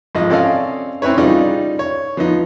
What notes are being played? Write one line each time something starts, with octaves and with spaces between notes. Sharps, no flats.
G#1 F3 D#5
C4 C#4 A4 D5 D#5 F5
C4 C#4 E4 B4 C#5
C#3 G3 D#4 F4 D5
C#5
F3 B3 D#4